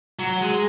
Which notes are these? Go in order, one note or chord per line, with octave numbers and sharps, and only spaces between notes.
F#3
G#3